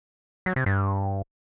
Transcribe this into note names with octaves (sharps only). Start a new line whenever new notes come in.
F#3
C3
G2